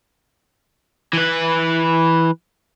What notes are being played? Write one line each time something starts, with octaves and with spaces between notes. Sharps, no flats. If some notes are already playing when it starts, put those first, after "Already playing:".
E3 B4